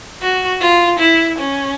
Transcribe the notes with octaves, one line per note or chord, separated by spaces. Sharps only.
F#4
F4
E4
C#4